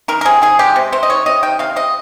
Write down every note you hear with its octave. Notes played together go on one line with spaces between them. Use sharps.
D#3 A#4
A#4
C3 G#4
D#3 G#4
G#3 G4
C3
C3 C5
D#5
D#3 C#5
C3 D#5
D#3 G5
C3 F5
C3 D#5